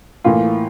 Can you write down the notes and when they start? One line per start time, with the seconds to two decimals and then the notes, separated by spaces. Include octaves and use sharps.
0.24 A2 E3 A#3 F4